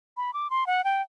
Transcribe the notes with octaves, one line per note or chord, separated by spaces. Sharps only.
B5
D6
C6
F#5
G5